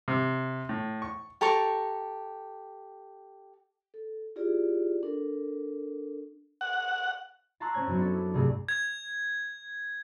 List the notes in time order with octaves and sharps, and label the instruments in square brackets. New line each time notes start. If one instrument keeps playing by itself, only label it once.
[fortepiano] C3
A2
C#6
[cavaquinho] G4 A4 A#5 C#6
[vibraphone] A4
E4 F4 G4 G#4 D5
D4 A4 A#4
[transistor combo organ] F#5
[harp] A5 A#5 C6 C#6 E6 F#6
C4 C#4 C5 C#5 G#6
F#2 F#3 B3 C#4
D4 A4
E4
C2 G2 A3 G#4
[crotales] G#6